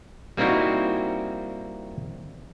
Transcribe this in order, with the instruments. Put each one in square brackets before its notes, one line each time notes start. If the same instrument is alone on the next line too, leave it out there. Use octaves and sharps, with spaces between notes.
[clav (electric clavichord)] G3 A#3 C4 D#4 E4 F#4